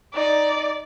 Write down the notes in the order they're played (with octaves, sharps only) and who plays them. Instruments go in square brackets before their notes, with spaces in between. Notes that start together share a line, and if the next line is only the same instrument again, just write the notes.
[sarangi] D#4 [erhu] D5